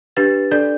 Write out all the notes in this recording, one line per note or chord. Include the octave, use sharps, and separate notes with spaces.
D4 G4 B4 A6
D4 A4 D5 G6